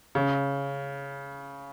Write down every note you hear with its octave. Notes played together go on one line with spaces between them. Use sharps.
C#3